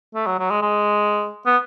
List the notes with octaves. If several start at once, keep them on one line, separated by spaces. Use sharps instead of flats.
A3
F#3
F#3
G#3
G#3
B3